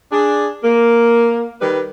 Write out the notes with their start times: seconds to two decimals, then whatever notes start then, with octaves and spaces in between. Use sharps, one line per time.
0.11 D4 G#4
0.64 A#3
1.61 D#3 G3 B4